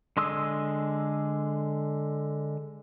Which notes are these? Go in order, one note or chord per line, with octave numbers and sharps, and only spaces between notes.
D3 G#3 C6 D#6 E6